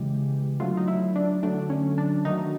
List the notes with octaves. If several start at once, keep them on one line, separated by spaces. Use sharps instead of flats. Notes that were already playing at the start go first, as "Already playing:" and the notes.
Already playing: C#3 E3 G#3 G4
D3 F#3 A3 F4
D#4
E4
D4
D3 F#3 A3 D4
C#4
D4
D#3 F#3 A3 D#4